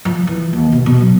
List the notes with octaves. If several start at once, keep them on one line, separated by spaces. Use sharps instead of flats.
F3
E3
D#2
B2
B2
F#3